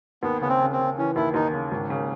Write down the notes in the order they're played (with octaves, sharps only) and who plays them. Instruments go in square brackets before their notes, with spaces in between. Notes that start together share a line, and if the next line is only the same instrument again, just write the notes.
[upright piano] D#2 [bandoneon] B3
[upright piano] C#3 [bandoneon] B3
[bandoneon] C4
[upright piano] C#3
[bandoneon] C4
[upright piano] C#3
[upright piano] E3 [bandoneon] C#4
[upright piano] D#2 [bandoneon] E4
[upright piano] D#2 [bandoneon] D#4
[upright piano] C#3
G#1
C#3